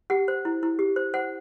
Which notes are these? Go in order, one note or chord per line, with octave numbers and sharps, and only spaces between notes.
G4 F#5
C5
E4
E4
G4
C5
C5 F#5